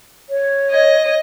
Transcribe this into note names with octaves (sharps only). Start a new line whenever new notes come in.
C#5
D#5